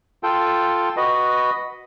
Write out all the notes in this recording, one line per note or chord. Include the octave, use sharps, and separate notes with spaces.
F4 A4 G5
F#4 B4 D#5